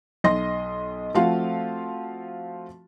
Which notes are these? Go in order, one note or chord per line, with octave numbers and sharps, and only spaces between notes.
B1 D#5 C6 A#6
F3 A3 C4 F4 F#4 F5